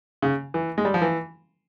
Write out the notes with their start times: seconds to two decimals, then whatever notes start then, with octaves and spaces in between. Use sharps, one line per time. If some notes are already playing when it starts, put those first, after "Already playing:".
0.22 C#3
0.54 E3
0.78 G#3
0.85 G3
0.94 F3
1.02 E3